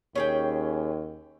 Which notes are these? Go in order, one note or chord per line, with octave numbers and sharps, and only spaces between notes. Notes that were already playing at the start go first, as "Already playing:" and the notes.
D#2 C#4 G#4 G5